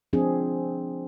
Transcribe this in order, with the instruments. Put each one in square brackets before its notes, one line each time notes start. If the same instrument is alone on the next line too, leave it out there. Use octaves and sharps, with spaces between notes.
[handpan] F3 C4 D4 G#4